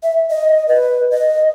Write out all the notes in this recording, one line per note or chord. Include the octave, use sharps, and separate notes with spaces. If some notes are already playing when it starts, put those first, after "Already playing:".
E5
D#5
B4
D#5